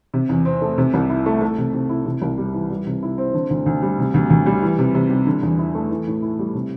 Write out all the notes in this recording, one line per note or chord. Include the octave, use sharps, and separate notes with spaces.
C3
E2
C4
A3
C3
C2
E4
A3
A3
C3
C3
E4
C3
C2
G3
E3
G3
C3
E4
C4
D3
D2
D2
G3
C3
D2
D2
G3
E3
C3
C3
G3
D3
E2
E4
A3
E3
A2
E4
G3
C3